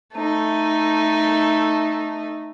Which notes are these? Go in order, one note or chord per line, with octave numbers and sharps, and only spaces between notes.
A3 D#4